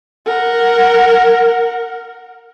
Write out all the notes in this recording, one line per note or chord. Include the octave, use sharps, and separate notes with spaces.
A#4 F#5